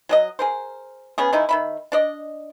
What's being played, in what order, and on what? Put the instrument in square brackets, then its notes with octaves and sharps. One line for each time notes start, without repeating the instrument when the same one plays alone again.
[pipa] F#3 G#4 D#5
G#4 A#4 C5
B3 C#4 G#4
D#3 G#3 D#4 E4
D#3 E5 B5
D4 D5 D#5